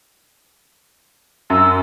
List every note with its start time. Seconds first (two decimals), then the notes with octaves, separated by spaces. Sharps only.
1.50 F#2 E6